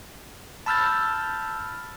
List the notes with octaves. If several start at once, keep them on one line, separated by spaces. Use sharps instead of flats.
A5 B5 E6 F6 G6 A6